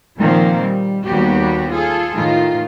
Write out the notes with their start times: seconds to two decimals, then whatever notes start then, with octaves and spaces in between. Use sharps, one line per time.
0.17 A#2 D#3 F3 A#3 C4
0.60 G3
1.04 D#2 G3 B3 F#4 G4
1.71 F4 G#4 A4
2.15 A2 D#3 F4